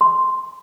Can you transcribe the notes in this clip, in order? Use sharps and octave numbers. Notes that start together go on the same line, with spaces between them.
C6